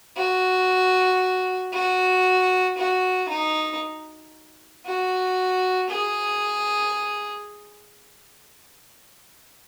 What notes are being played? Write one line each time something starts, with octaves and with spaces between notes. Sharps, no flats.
F#4
F#4
F#4
D#4
F#4
G#4